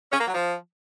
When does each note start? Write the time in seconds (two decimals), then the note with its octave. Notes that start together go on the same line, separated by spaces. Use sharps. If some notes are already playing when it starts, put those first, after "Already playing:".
0.12 C#4
0.20 A#3
0.27 F#3
0.35 F3